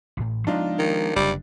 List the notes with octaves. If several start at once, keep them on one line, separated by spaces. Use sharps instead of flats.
A1 A2
F3 G#3 B3 D4 D#4 F4
D#3
F#1 D3 G3